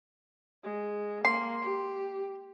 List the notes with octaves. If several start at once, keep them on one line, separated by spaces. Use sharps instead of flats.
G#3
A#3 C6
G4